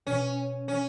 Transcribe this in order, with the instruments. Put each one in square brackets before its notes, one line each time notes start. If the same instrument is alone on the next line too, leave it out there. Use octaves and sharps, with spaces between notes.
[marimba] B2 [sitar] C#4
[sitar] C#4